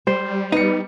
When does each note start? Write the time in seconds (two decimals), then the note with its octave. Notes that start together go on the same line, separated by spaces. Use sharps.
0.07 G3 C5
0.52 B3 D#4 C#7